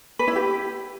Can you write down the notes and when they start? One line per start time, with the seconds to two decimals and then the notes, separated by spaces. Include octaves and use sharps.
0.19 B4
0.28 E4
0.36 G4